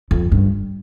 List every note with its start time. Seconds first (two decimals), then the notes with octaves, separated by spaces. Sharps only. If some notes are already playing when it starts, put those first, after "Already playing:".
0.11 F2
0.32 G2